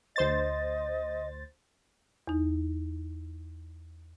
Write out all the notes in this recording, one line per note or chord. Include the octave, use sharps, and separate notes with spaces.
D2 C5 D#5 A6
E2 D#4